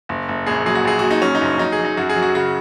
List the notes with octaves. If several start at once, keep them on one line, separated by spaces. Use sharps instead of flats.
F#1
F#1
A#1 G#4
F#3 G#4
F#4
A#1 G#4
A#1 F#4
D#4
F#3 C#4
D#4
F#1
F#3 D#4
G#4
F#3
D#4
F#2 F#4
G#4
F#3
F#4
C#3 F#4